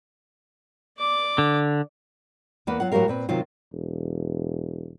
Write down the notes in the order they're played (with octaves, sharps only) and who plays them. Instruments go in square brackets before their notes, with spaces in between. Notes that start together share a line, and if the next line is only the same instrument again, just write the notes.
[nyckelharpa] D5 D6
[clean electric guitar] D3
[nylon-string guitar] E2 A#3 B3 B4
F#3 F4 F#5
A2 F#3 F#4 G4 A#4 F5
A#2 C4 B4
C3 D#3 F#3 F4
[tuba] E1